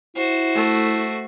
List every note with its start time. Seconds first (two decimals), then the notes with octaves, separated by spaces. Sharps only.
0.17 E4 F#4 C5
0.55 A3